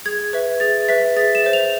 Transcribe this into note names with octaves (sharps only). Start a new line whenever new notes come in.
G#4 G#6
B4 E5
G#4 A6
B4 E5 B6
G#4 A6
E7
C5 E5
F7